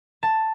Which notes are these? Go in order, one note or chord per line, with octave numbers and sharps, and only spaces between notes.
A5